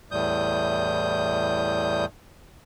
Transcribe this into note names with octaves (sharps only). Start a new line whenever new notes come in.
E2 A2 G3 D#6 G6